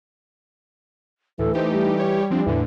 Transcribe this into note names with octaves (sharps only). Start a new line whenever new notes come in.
D2 A2 E3 A4
A3 D#4 G4 C5
G3
G4 C#5
F3 C4 D4
E2 A2 D3 E3